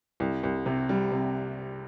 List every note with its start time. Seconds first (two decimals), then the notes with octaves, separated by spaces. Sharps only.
0.20 C2
0.43 C2
0.66 C3
0.89 G3
1.12 C3